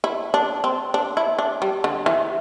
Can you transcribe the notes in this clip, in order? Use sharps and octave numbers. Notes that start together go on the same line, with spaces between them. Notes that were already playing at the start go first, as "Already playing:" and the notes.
E4
D4
C4
D4
E4
D4
G3
D3
E3